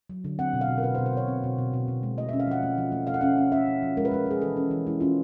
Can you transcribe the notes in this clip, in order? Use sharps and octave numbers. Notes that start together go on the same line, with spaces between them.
F#3
D3
C4 F#5
B2
F5
B2
A#4
B2 B4
C5
B2
C5
B2 C#5
C4
B2
B2
B2
B2
G#3
A3 D#5
E5
C#4
F5
F3 F#5
A3
F3
A3
A3 F5
F#5
C#4 F5
C#4
C#4 E5
A3
F3
G#3 A#4
B4
G#3 A#4
G#3 G#4
E3 A4
C#4
E3
G#3 E4
C#4 F4